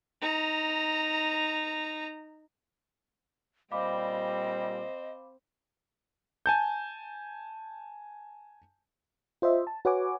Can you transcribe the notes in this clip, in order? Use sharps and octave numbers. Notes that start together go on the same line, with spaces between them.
D#4 A#5
A#2 G3 C4 C5 D#5 F5 B5 D6
G#5 A5 G6
F4 C5 D#5 E5
A5
F#4 B4 C#5 F#5 G#5 D6